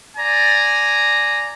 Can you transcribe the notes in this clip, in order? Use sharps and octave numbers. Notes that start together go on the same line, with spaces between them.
D5 G#5 A#5